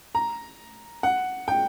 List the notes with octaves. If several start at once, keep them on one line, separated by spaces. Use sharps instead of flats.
A#5
F#5
G5